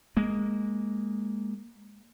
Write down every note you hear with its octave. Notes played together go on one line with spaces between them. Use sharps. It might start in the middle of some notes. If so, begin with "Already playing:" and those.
G#3 A#3